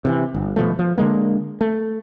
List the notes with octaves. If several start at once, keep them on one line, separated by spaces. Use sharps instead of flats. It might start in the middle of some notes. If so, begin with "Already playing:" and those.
C3 D#3 E3
G1
D#1 B2 F3 A3
F3
D3 D#3 G#3 A#3
A3